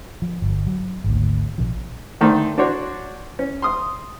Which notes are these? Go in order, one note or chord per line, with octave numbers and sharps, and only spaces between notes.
F3
G1
F#3
G#1 D2
A#1 C3 F3
D3 D#3 A3 C5
D4 F#4 C5 C#5
C#4
C6 D#6